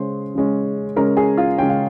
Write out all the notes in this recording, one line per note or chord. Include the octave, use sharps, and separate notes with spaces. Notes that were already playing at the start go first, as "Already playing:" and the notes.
Already playing: C#3 G#3 C#4 C5 C6
C#3 G#3 C#4
C#3 G#3 C#4 A#4 A#5
G#4 G#5
F4 F5
C#3 G#3 C#4 G5
F5